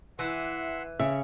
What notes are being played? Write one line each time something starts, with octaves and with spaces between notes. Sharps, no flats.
E3 E5 F#5 C6
C#3 E5